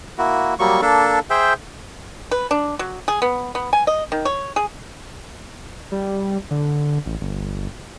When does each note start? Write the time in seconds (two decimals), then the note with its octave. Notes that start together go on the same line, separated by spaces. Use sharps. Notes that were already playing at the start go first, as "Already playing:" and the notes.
0.18 A#3 E4 F#4
0.59 F#3 G3 A#3 C#6
0.82 A#3 D4 A4
1.30 G#4 C5 E5 G5
2.31 B4
2.51 D4
2.79 F#3
3.08 G#4
3.22 B3
3.55 B3
3.73 G#5
3.87 D#5
4.12 D#3
4.25 C#5
4.56 G#4
5.92 G3
6.51 D3
7.06 A1
7.21 G1